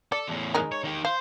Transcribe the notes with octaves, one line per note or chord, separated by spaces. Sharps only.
A4 D5
E2 A2
G#3 D#4 A#4
C#5
D#3 G4
C5 F5